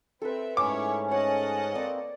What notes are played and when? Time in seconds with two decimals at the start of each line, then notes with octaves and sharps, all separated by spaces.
0.22 C4 A4 B4 E5
0.57 G#2 A3 C#4 E4 C#5 D6
1.12 C#5 D#5 F#5 A5
1.75 A#3 C4 D5